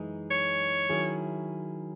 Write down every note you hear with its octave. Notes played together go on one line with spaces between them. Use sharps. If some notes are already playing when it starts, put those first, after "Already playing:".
Already playing: F#2 E3 G#3 D#4 G#4
C#5
D#3 F#3 C#4 E4 G#4